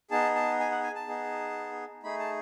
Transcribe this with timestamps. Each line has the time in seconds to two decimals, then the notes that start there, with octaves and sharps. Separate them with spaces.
0.11 B3 D#4 G#4 A5
0.35 A5
0.59 G#5
0.72 F#5
0.83 G#5
0.95 A5
1.07 B3 D#4 G#4
2.03 A3 D#4 G#4 B5
2.19 A5